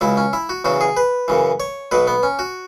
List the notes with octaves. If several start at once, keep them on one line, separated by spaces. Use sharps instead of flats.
C#2 C#3 F#3 E4
C#4
E4
F#4
E2 C#3 F#3 F#4
G#4
B4
F#2 C#3 E3
C#5
B1 B2 F#3 B4
B3
C#4
F#4